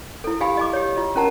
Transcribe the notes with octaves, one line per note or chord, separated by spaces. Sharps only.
E4 A4
G4 F5 G#5 B5
D#5 G#5 D6
G4 C#5
F4 D#5
C#4 F4 A#4 F#5 A5 A#5